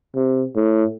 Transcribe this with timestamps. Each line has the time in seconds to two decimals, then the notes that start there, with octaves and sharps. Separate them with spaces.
0.15 C3
0.56 A2